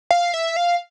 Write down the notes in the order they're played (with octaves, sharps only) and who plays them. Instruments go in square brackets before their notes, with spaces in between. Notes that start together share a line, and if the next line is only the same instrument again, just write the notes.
[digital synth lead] F5
E5
F5